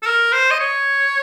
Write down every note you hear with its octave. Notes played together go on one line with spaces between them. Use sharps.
A4
A#4
C5
D#5
C#5